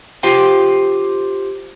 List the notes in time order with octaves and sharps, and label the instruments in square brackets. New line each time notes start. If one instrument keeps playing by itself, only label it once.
[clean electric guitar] F4 G4 C5 F5 G5